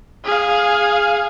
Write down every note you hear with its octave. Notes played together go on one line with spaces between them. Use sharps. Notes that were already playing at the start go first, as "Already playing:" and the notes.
G#4 F5